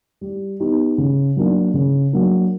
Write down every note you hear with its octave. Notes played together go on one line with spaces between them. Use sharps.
G3
B3 D#4 G4
C#3
F#3 A#3 D4
C#3
F#3 A#3 D4